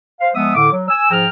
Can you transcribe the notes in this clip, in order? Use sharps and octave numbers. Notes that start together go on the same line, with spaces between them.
C5 F5
F3 G#3 B3 E5 D#6
A2 D3 D6
F#3
G#5 E6
G#2 F3 G#4 G5 A#5 F6